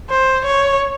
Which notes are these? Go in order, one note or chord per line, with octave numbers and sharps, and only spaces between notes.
C5
C#5